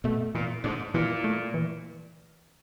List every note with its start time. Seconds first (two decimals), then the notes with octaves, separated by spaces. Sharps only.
0.04 B2 A3
0.35 A#2 E3
0.64 G#2 D4
0.94 A#2 E3
1.24 A3
1.54 E3